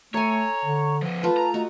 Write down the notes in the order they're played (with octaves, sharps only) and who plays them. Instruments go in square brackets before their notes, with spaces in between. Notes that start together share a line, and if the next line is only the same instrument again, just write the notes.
[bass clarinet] A3 [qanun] A4 G#5 [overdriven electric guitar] C#5 [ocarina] A#5
[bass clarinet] D3
[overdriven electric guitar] F3 B3
[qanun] A3 F4 [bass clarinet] B4 [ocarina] A5
[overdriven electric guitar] A#5
[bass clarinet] A3 [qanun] F#4 [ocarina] D#5